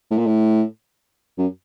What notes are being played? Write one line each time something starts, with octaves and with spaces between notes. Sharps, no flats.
A2
A#2
A2
F#2